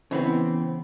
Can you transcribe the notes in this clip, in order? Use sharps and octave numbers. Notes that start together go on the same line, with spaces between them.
C#3 E3 B3 C4